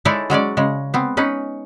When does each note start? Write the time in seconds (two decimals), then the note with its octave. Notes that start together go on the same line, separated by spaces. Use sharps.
0.05 G#3 D#4 E4 A4 C#5 D5
0.30 F#3 G#3 C#4 D5
0.57 C#3 G#3
0.94 B3 C4
1.17 C#4 D#4 B4